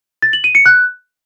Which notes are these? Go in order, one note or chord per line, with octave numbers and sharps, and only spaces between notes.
A6
F#7
D#7
C#7
F#6